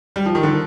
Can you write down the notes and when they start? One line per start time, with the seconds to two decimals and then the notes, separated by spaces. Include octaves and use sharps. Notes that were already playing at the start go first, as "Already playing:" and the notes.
0.16 G3
0.26 F3
0.35 D#3
0.43 D3